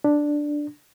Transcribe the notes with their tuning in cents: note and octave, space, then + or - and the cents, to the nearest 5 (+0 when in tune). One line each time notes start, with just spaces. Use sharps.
D4 +5